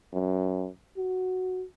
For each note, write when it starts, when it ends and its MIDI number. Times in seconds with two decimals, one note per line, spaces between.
0.13 0.68 42
0.97 1.65 66